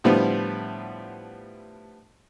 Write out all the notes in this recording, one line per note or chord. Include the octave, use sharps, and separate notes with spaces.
A2 D3 F3 G3 B3